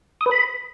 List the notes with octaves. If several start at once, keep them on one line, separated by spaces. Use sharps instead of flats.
D#6
B4
B5